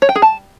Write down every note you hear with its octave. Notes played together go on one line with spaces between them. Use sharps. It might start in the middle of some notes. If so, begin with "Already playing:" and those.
C#5
G5
G#4
A5